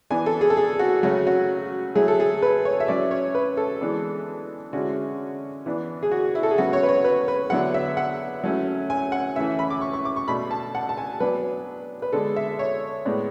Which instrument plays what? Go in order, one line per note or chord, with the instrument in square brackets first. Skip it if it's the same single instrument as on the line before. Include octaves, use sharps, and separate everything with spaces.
[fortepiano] E3 B3 D4 G#5
A4
G#4
A4
G#4
F#4
C#3 F#3 A3 C#4 F#4
F#4
F#3 A3 E4 G#4
A4
G#4
B4
C#5
E5
F#3 C#4 E4 D5
C#5
B4
A4
E3 G#3 B3 D4
D3 G#3 C#4 E4 F#4
E3 B3 D4
G#4
F#4
E4
A4
G#4
C#3 F#3 B3 F#4
C#5
B4
C#5
B4
B4
D3 F#3 B3 E4 F#5
E5
F#5
F#3 A3 C#4 E4
G#5
F#5
E3 A3 C#4 E4 E5
B5
D6
C#6
C#6
D6
C#6
B2 A3 D4 B5
A5
F#5
A5
G#5
F#3 B3 D4 B4
B4
D3 G#3 B3 A4
E5
C#5
A2 G#3 B3 D4